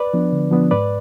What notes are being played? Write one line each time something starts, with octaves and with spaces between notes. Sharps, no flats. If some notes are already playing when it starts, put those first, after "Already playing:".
Already playing: B4 D5
F3 B3 D4
D3
F3 B3 D4
G#2 B4 D5